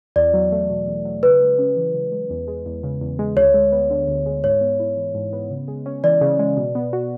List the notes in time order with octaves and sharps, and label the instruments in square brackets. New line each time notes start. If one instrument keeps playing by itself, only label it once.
[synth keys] E2 [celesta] D5
[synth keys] F#3
A3
B2
E2
F#3
[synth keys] C#3 [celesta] B4
[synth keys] G#3
C#4
E3
C#3
G#3
E2
G#3
E2
C#3
E2
G#3
[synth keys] D2 [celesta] C#5
[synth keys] G#3
B3
D3
D2
G#3
[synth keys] G#2 [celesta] C#5
[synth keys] B3
E4
E3
G#2
B3
C#3
G#3
C#4
[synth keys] E3 [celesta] D5
[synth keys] C#3
G#3
B2
B3
F#4